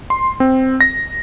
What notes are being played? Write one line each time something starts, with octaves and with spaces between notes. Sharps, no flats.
C6
C4
A#6